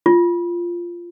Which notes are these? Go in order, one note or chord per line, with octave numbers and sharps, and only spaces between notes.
F4